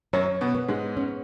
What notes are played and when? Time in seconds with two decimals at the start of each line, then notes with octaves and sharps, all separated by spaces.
0.13 F#2 F#3 C#5
0.41 B2 B3
0.55 B3
0.68 G#2 G#3
0.97 C#4